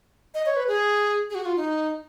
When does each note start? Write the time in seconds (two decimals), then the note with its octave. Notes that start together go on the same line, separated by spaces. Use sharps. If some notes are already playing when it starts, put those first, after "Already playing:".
0.34 D#5
0.46 C#5
0.56 B4
0.68 G#4
1.30 G#4
1.35 F#4
1.45 F4
1.57 D#4